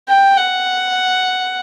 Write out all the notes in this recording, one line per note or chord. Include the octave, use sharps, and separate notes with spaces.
G5
F#5